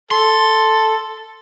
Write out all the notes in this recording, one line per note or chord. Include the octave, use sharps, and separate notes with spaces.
A4 C6